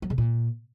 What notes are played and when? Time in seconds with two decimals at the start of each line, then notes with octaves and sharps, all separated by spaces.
0.02 F#3
0.10 C#3
0.18 A#2